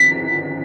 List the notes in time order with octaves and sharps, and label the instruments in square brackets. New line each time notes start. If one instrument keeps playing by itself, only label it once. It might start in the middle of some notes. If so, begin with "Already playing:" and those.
Already playing: [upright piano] B6